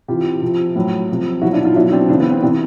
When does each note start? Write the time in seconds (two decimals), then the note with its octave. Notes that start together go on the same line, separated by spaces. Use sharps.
0.08 C3 E3 F4 G4
0.42 C3 F3
0.75 A2 F#3
1.09 C3 F3
1.42 B2 F#3 E4 F#4
1.53 D4 E4
1.65 D#4 F4
1.75 B2 F#3 D4 E4
1.92 C4 D4
2.08 C#3 C4 D4
2.12 E3
2.19 B3 C#4
2.31 C4
2.42 C3 E3 C4 D4